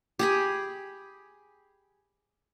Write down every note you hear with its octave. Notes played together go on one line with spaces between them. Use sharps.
G4 G#4 B5